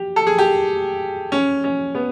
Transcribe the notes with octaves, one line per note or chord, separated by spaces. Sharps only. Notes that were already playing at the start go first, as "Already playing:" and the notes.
Already playing: G4
A4
G#4
G4
C#4
C#4
B3